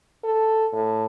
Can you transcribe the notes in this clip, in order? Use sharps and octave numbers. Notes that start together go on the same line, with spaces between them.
A4
A2